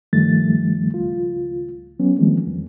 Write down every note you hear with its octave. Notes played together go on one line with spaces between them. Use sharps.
G2 D#3 F3 G3 A3 A6
C#2 F4
F#3 B3 C#4
D#3 F3 G3 G#3 A#3 C4
E2